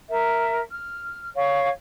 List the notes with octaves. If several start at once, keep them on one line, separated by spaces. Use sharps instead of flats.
A#4 E5
F6
C#5 F5 C#6